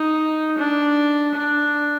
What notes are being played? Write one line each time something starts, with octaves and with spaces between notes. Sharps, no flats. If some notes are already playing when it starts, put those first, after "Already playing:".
Already playing: D#4
D4
D4